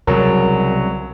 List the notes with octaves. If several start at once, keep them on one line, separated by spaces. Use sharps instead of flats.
C2 C#3 F#3 A#4